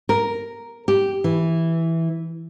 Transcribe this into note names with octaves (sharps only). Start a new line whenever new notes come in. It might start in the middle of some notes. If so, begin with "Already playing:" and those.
A#4
G4
E3